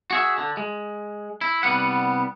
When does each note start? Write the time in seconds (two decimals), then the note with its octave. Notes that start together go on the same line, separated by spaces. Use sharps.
0.11 F#4 G#4 E5
0.38 D3
0.57 G#3
1.41 E4
1.63 C2 F3 G3 B3 F#5